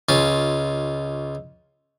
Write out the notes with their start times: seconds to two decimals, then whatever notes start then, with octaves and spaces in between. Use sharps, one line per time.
0.09 C#2 C#4 F4